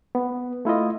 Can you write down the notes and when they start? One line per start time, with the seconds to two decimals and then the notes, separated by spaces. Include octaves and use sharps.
0.15 B3
0.65 A3 E4 F4 D#5